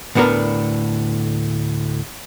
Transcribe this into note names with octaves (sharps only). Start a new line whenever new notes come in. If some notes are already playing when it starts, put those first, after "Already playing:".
D2 A2 B3 D4 A#4